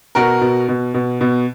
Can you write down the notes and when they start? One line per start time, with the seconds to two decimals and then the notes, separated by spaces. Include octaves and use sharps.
0.15 B2 F#4 A#4
0.41 B2
0.68 B2
0.94 B2
1.21 B2